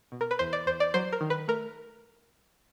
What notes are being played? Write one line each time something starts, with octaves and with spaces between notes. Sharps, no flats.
B2
A#4
B4
E2 C5
D5
E2 C5
D5
F#3 C5
A#4
D#3
B4
A3 A#4